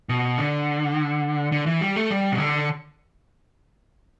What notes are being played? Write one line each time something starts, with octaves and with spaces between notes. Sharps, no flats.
B2
D3
D3
E3
G3
A3
G3
B2
D3